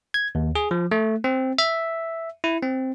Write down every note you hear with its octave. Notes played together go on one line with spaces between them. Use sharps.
G#6
D#2
G#4
F3
A3
C4
E5
E4
C4